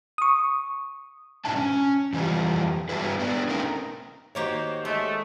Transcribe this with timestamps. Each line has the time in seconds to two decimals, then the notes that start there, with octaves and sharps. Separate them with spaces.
0.18 C#6 D#6
1.45 G#2 B2 D4 E4 A5
1.56 C#4
2.13 F2 E3 F3 G3
2.89 G2 A#2 E4 F#4 G#4 B4
3.20 B3 D4
3.49 A3 C4 C#4 D#4 A#4
4.35 D#3 A#3 F#4 G4 C5 C#5
4.85 G#3 A3